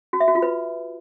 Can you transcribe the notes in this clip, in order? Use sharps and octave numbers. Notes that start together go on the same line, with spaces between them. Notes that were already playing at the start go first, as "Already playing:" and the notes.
F#4
E5
F#4
F4
B4